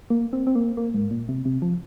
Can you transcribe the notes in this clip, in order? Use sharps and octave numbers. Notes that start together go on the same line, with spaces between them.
A#3
C4
C4
A#3
A#3
G#2
A#2
C3
C3
F3